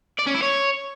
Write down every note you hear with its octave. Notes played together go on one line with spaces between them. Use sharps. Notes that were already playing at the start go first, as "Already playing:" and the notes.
D5
C#4
E4
C#5